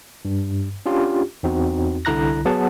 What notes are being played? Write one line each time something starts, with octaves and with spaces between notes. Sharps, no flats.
G2
C#4 D4 F4 G4
E2 C4 D#4 F#4
C2 D3 E4 A#5 F#6 A#6
F#3 B3 G#4 F#5 A5